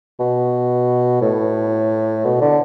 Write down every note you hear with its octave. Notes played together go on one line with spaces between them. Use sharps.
B2
A2
B2
D3